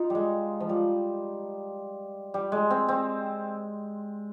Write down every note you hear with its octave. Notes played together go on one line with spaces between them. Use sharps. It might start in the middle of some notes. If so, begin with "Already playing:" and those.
Already playing: D#4 F4
G3 G#3
F3
G3
G3
G#3
C4
C4